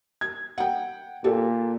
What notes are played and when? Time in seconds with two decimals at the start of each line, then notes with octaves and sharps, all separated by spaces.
0.21 G#6
0.58 F#5 G5
1.24 A#2 G4 A4